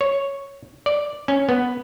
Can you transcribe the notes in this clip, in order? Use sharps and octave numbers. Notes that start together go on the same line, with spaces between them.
C#5
D5
C#4
B3